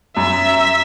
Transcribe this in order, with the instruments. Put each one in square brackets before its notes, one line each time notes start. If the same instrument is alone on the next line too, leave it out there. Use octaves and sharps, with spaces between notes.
[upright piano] F#2 [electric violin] E5